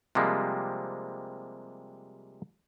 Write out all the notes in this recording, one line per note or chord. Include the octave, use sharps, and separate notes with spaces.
C3 F3 G3 G#3 A#3